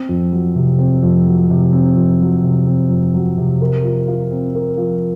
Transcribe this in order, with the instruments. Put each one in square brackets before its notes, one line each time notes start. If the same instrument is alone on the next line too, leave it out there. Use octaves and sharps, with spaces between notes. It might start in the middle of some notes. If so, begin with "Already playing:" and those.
Already playing: [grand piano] C4
F2
F#3
C3
C4
F2
F#3
C3
C4
F2
F#3
C3
C4
F2
F#3
C3
A#4
F3
F4
C4
A#4
F3